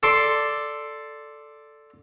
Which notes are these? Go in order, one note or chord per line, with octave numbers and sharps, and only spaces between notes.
A4 D5 C6 D6